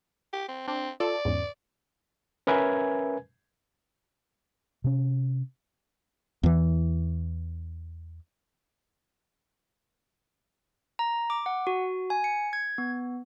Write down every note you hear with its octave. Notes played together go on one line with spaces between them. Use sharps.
G4
C4
C4 D4
F4 A4 D5
E2 G#2 C#3
C#4 A#4 B4 E5 G#5 G#6
C3 C#4
E2 E3
A#5
D6
F#5
F#4
G#5
C#7
G#6
B3